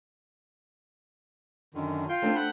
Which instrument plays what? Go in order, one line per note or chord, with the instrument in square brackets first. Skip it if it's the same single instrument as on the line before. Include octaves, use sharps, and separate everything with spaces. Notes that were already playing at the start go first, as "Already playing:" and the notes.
[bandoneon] F#2 D3 D#3
F4 G5 C6
[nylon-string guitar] A3 C4 D4
[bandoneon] F#5 B5 G6